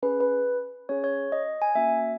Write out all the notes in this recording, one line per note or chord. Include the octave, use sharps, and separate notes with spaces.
C#4 G#4 B4
B4
C#4 G#4 C#5
C#5
D#5
G#5
A#3 C#4 F#4 E5